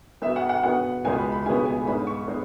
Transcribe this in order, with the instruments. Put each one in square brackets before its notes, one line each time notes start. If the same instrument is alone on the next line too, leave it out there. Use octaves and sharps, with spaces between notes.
[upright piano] B3 E5
B2
F#5
F#5
B2 B3 F#5
C#2 B2 G#3 B3 G#5
B5
B5
C#2 B2 G#3 B3 G#5
G#5
G#2 G#3 B3 B5
C#6
G#3 B3